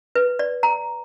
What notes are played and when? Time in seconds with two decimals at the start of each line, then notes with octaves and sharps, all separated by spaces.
0.16 B4
0.39 D5
0.63 A#5